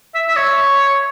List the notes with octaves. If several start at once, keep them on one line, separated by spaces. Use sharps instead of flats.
E5
E5
C#5